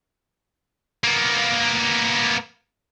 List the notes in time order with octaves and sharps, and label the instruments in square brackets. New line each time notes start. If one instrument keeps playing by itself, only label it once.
[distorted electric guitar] A#3 B3